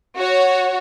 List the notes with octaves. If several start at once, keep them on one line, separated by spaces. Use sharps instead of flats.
F#4 C#5